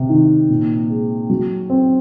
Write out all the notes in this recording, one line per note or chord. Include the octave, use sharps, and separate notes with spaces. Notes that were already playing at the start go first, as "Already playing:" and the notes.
Already playing: C3
D#3
A#2
G#3
F#3
C4